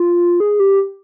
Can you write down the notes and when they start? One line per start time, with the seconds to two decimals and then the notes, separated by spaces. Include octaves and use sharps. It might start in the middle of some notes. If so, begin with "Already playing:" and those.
Already playing: F4
0.40 G#4
0.60 G4